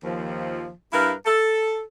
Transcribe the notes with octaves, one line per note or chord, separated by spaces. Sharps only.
D#2 F3
G2 E4 A#4 B4 F5
A4